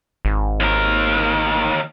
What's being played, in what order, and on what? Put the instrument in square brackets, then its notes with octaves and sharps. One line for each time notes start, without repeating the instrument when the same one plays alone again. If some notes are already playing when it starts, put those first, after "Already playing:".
[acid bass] G#1
[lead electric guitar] D#2 A#4